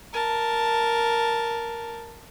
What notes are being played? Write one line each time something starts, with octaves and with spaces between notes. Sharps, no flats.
A#4 A5